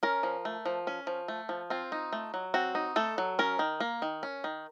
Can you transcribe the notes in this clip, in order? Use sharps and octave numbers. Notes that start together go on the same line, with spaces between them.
C#4 A#4
F3
A3
F3
C#4
F3
A3
F3
C4 F4
D#4
A3
F#3
C4 F#4
D#4
A3 A4
F#3
C#4 A#4
D#3
A#3
D#3
C#4
D#3